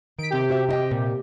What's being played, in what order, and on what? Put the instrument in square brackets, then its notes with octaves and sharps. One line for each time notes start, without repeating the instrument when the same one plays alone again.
[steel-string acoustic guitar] D#3 [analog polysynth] B6 D7
[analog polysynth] C3 G4
[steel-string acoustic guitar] F#4 C5 E5
E4 D#5 G5
A#2